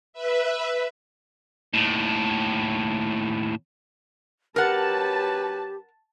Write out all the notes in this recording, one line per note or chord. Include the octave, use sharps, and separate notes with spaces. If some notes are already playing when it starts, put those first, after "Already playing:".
B4 E5
D#2 A2
F#3 C#4 G4 A#4 B4 F#5 A5